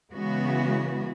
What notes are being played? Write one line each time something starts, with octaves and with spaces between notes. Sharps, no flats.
C#3 E3 G#3 B3 F#4